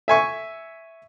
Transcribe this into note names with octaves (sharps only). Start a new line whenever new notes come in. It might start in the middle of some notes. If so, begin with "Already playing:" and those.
E5 G#5 C#6